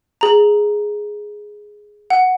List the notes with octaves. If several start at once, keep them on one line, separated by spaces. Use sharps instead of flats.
G#4 A#5
F#5